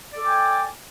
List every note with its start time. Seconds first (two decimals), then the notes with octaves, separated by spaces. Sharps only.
0.13 D5
0.17 A4
0.20 D6
0.24 G5
0.28 G#5